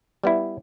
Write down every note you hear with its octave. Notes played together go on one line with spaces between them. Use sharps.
G3 B3 E4